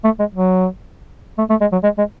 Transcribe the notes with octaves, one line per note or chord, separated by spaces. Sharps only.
A3
G#3
F#3
A3
A3
G#3
F#3
G#3
G#3